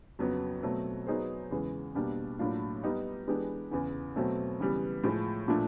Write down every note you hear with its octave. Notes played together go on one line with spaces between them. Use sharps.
F2 C#3 F#3 B3
B2 F#3 A3 C4
F#3 B3 D#4 G#4 C5
E2 C#3 E3 G#3
B2 G3 A#3 D4 G4
A2 F#3 A#3 D4 F4
G3 B3 D#4 G4
E3 G#3 B3 D4 G4
E2 C#3 E3
B2 F#3 A3 C4
C#3 E3 G3 B3
A2 F3 G#3
A#2 F3 A3 D4